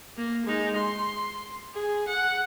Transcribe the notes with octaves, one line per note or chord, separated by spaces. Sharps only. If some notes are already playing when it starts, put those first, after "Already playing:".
A#3
G#3 D#4
C6
G#4
F#5